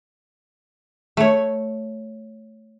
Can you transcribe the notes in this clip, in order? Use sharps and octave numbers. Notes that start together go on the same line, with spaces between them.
A3 C#5